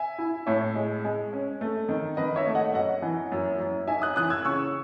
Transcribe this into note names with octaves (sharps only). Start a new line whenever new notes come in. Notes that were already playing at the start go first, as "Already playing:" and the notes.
Already playing: E5 G#5
E4
A2 C#5 E5
G#3
G#3
C#4
A3
D#3
D#3 B4 D#5
C#5 E5
A3
D#5 F#5
F#2 D#5 F#5
E3
F#2
F#2
D#4 E5 G#5
D#6 F#6
E3 D#6 F#6
E6 G#6
C#3 C#6 E6